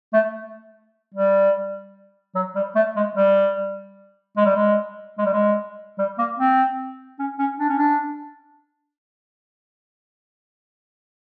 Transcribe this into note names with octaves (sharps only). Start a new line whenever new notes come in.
A3
G3
F#3
G3
A3
G#3
G3
G#3
G3
G#3
G#3
G3
G#3
G3
A#3
C4
C#4
C#4
D4
C#4
D4